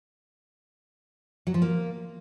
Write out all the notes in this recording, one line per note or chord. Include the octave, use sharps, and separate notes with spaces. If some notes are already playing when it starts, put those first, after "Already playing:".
F#3
F3
A#3